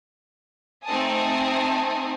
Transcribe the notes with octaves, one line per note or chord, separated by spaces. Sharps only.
A3 C4 D#4 G#5 A5 D#6